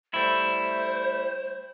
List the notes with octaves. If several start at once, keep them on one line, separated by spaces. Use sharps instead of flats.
G3 A3 E4 C5